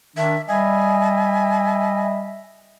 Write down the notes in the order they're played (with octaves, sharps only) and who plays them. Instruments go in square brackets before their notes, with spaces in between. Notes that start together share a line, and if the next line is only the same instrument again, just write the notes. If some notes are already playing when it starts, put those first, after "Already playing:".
[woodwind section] D#3 D4 [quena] E5
[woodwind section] G3 D#5 E5 [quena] G#5